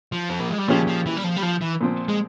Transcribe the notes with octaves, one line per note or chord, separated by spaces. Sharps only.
F3
C4
A#3
G#3
G3
A#2 F3 G#3 C#4 G4
F3
E3
G3
F3
G3
F3
E3
A#2 F3 C4
G#3